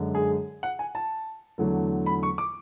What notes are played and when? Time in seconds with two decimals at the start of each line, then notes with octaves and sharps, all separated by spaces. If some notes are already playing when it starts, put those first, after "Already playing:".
Already playing: F#2 D3 G#3
0.15 G#4
0.63 F#5
0.79 G#5
0.95 A5
1.58 E2 D3 F#3 A3
2.06 B5
2.23 C#6
2.38 D6